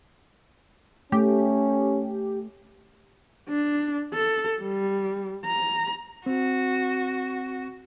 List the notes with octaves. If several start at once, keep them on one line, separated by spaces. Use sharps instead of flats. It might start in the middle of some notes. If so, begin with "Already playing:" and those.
A3 C#4 G4
D4
A4
G3
A#5
C4 F#4